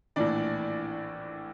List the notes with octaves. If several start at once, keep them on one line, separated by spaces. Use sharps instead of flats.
A#1 A2 E3 D4 D5